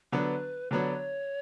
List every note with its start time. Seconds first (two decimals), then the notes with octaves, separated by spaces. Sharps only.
0.12 D3 F#3 B3 D4 B4
0.71 D3 F#3 B3 D4 C#5